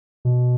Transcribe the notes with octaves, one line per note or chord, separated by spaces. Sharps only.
B2